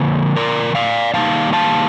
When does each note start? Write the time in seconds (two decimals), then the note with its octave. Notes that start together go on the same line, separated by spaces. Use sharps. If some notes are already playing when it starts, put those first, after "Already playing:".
Already playing: D3 F3 A#3
0.36 A#4 D5
0.75 D5 F5
1.14 D#3 G3 A#3 D#4 F5 A5
1.53 F5 A5